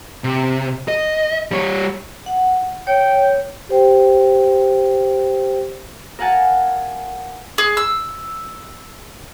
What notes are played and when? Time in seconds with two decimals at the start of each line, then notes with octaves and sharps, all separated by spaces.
0.24 C3
0.88 D#5
1.51 G3 C#5
2.26 F#5
2.87 C#5 G5
3.69 G4 C5 G5
6.19 A#4 F5 F#5 G#5 A5
7.58 G#4
7.77 E6